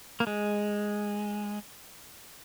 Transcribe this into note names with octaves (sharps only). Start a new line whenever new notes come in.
A#3
G#3